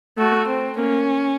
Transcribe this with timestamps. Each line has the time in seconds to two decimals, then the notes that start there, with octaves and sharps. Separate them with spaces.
0.18 A3 F#4
0.48 C4
0.78 A#3 C#4